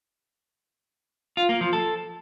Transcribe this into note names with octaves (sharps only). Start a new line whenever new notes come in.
F4
A#3
F3
A4